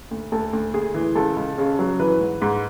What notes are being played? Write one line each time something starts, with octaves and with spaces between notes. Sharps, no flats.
D2
D2 A4
D2
D2 G#4
E3
C#2 A4
C#2
C#3
F#3
E3 B4
G#2
G#2